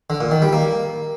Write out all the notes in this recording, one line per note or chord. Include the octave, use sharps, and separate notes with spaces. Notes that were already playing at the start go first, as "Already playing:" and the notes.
D3
A#2
D#3
G3
A#3